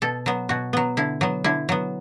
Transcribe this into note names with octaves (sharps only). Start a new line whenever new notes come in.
B2 A4
F#3 B3
B2 F#4
F#3 B3
D3 E4
F#3 B3
D3 E4
F#3 B3